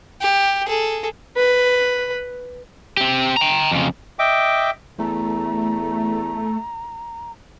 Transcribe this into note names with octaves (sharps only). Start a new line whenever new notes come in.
G4
G#4 A4
B4
C4 G4
G5 A#5
F2 C#3
D#5 E5 G5 D6
E2 A3 A#5